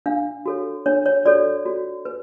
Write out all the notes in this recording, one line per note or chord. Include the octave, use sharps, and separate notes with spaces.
D4 F5
F#4 A4 C#5
D4 C#5
C#5
F#4 A4 C#5 D5
F#4
B4